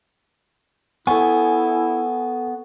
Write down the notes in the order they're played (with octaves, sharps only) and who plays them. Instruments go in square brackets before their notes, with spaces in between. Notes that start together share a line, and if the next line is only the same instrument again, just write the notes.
[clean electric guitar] B3 [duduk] E4 [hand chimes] A4 C#6 [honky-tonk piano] G#5